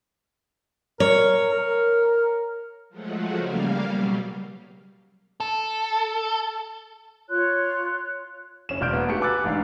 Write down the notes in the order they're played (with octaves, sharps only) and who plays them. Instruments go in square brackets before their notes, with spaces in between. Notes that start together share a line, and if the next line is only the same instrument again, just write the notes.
[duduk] A#4 [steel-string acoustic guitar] C#5
[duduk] A#4
[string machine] F3 F#3 G#3 A3 F#4
C#3 G3 A#3 F5
B2 F#3 G3
[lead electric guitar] A4
[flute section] F4 C#5 C6 F#6
[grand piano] F#1 C#4 E7
E1 D5 F6 G6 D7
A#3 B3
G#2 A3 F#4 G4 C#7
B4 G#5 D6 E6 F#6 A6
A1 G#2 D4 F5